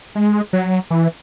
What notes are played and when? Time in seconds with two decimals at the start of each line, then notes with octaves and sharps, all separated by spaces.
0.15 G#3
0.53 F#3
0.90 E3